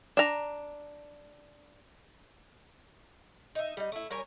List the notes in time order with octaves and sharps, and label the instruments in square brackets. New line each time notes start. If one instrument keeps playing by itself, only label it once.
[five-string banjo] D4 A#5
[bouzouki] D#4 E5
G3 D#4
A3 E4
G3 A#4 C#5 G#5